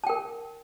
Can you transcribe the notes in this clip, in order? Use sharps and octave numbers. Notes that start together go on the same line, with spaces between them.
A#4 G5 A5